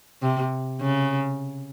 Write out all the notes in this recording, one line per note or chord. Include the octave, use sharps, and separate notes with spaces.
C3
C#3